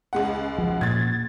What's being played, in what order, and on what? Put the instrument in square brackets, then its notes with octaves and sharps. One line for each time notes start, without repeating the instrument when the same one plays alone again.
[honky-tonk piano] C#2 G#3 F#5
[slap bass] F3
[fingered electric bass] A#2 [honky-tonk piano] G#6 A6